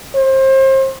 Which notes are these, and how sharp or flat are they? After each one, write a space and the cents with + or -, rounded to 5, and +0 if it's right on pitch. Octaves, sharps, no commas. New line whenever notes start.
C5 +30